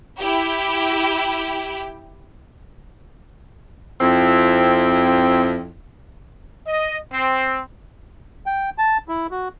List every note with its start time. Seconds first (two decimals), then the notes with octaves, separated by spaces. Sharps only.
0.19 E4 G4
4.01 F2 C4 E4
6.66 D#5
7.12 C4
8.46 G5
8.78 A5
9.08 E4
9.31 F#4